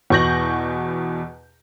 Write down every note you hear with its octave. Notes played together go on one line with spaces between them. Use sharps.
E2 B2 C#6 G6 A#6 F#7